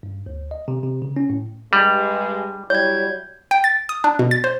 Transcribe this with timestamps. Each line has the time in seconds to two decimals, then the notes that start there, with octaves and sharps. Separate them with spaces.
0.03 G2
0.26 D2
0.51 D#5
0.68 C3
0.83 C3
1.02 C#3
1.16 C#4
1.30 A2
1.73 G2 G3 G#3
2.70 F#3 G3 E4 C#5 G6 G#6
3.51 G5
3.64 A6
3.89 D#6
4.04 D4
4.19 B2
4.31 A6
4.44 C5